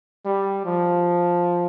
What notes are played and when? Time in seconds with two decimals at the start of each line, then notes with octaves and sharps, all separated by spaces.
0.25 G3
0.65 F3